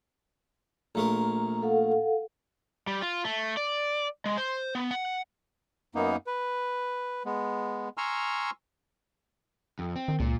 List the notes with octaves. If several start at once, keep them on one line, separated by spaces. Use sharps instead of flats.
A#1 A3 A#4 A#5
A4 F5 F#5
G3
F4
A3
D5
G#3
C5
B3
F#5
F#2 A#3 B3 D#4
B4
G#3 B3
G#5 A#5 C6 C#6 E6 F6
F2
C4
D#3
C#2 A#2